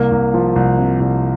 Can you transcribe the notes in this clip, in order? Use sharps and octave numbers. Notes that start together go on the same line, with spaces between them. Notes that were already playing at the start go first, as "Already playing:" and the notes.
Already playing: C2 A#3
C2
F3
C2
C3
C2